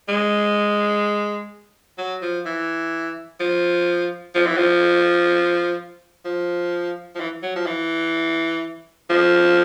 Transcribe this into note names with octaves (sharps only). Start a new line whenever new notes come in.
G#3
F#3
F3
E3
F3
F3
E3
F3
F3
F3
E3
F#3
F3
E3
F3